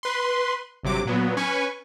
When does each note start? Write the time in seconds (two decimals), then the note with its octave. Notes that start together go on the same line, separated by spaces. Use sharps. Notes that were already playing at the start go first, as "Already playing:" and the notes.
0.03 B4 C6
0.83 G1 C3 F#3 D6
1.05 A#2 F#3 B3
1.37 C#4 B4 G#5 C#6